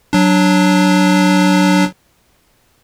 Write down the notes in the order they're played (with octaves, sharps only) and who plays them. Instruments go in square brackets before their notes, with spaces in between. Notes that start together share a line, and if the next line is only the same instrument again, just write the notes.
[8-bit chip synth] F#3 D4